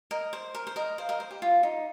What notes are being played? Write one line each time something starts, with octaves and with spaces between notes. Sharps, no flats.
A#4 D#5
C5
A#4
C5
A#4 D#5
C5 F5
A#4 D#5
C5
G4
F4
D#4